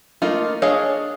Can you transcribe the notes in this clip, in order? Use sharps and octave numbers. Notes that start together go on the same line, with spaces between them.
A3 A#3 D#4 F4
D4 G#4 C#5 D#5 F5